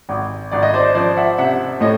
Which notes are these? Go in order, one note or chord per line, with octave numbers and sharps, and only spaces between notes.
G#1
G#1 D5
D#5
C5 D5
F3 C5 D5
E5 F#5
C3 E5 F#5
A2 C#5 D#5